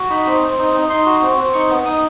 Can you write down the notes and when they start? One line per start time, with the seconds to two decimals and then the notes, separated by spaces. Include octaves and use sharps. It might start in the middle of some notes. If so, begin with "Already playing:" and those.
Already playing: F#4
0.10 D#4 B5
0.26 C4
0.42 C4
0.59 D#4
0.74 D#4
0.89 D#4 C6
1.06 F#4
1.22 C4
1.37 C4
1.53 D#4 C#6
1.70 B3
1.85 D#4 D#6